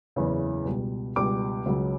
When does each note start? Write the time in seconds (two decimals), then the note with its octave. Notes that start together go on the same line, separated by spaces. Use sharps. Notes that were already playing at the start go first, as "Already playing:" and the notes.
0.16 F#1 E2 C#3 E3
0.65 C#2 B2 G3
1.16 C#2 B2 G3 D6
1.66 C#2 C#3 F#3